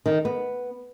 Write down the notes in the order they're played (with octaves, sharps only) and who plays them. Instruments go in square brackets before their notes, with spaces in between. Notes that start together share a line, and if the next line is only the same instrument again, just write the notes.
[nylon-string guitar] D#3
B3